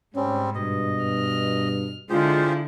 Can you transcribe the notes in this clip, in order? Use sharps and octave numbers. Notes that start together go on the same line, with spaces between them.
G#2 G3 C4 C#4
G2 B2 D#5
F6
D3 G#3 E4 F4 G4 G#4 C5